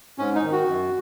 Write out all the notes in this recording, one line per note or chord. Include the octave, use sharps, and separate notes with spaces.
G#2 C#4
D#4
D#3
F#4
F#2